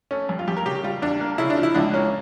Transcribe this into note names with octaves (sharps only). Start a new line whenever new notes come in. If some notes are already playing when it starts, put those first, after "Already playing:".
A3 C#4
G2
F4
G2 G4
A#4
C#3 G4
G3 F4
E2 D4
A#3
C#3 E4
D4
F3
E4
C#2 D4
A#3 C#4